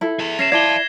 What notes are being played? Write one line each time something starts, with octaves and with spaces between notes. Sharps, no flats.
E4 A4
G#4 E5
C#4 A#6 C7 E7
E4 D5 F5 A5 G#6 G7